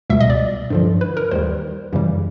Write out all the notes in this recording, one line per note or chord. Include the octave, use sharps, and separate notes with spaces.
C#2 B2 G3 E5
D#5
D5
G2 D3 F3
B4
A#4
D#2 D#3 G3 C5
F#2 C#3 E3 G3